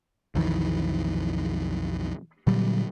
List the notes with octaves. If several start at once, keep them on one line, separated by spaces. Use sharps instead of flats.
B1 F2 D#3 E3
A#2 D3 F#3 G3